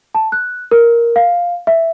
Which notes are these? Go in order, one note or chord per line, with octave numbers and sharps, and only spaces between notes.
A5
F#6
A#4
F5
E5